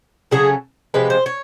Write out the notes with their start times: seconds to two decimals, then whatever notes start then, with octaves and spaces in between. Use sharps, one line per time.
0.31 C#3 F#3 A3 G#4
0.94 C3 F3 G#3 B4
1.10 C5
1.26 C#5